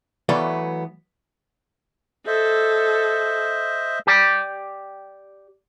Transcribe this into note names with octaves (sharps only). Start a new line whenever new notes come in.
E3 F#3 A3 B3 D5 F5
A4 C5 D#5 E5
G4 D5